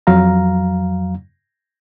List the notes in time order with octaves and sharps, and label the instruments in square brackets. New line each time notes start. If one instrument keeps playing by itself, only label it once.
[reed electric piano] F2 F#3 F5 A#5